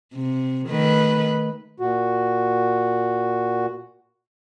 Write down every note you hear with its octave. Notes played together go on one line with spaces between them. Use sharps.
C3
D#3 A3 B4
A#2 F#4